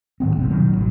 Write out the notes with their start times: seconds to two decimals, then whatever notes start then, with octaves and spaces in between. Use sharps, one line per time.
0.20 G#2 D#3 B3 C4
0.36 D#1 A#1 G#2 C3
0.50 B2 D#3 F#3
0.77 A1 F#3